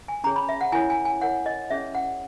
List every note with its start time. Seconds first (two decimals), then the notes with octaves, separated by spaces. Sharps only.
0.08 G#5
0.24 C#4 G#4 C#5 A#5
0.36 B5
0.49 E5
0.61 F#5
0.72 E4 A#4 C#5 G#5
0.90 G#5
1.05 G#5
1.21 E4 A#4 C#5 F#5
1.46 D#5
1.70 C#4 G#4 C#5 E5
1.95 F#5